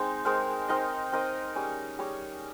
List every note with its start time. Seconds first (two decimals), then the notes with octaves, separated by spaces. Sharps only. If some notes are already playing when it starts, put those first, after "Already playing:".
Already playing: G#3 C4 D#4 G#4 C5
0.25 G#3 C4 D#4 A#4
0.68 C4 D#4 A#4 D#5
1.12 C4 D#4 A#4 D#5
1.55 G3 C#4 G#4 C#5
1.99 G3 C#4 G#4 C#5